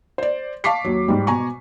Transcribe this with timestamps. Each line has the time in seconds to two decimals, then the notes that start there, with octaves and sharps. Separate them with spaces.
0.18 C5 D5
0.64 F5 A5 C#6 D6 B6 C7
0.85 D#2 F#3
1.08 G#2 G3
1.27 B2 G#5 A#5 C#6